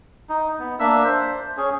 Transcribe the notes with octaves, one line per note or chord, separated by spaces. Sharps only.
D#4
B3
A#3 D4 E5 E6
C5
C#4 G#4